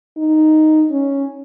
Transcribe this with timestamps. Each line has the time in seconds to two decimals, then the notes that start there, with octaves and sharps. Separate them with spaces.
0.17 D#4
0.91 C#4